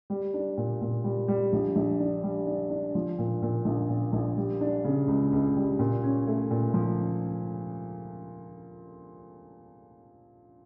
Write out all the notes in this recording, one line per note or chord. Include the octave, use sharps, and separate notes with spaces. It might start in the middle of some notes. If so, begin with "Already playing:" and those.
G3
D4
A#2
A#2
G3
G3
A#1
A#1
D4
G3
D4
D4
F3
A#2
A#2
A#1
A#2
A#1
G3
D4
C#3
C#2
C#2
G3
A#2
C#4
A3
A#2
F3